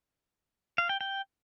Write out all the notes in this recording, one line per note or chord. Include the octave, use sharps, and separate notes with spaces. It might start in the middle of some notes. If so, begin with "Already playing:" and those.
F5
G5
G5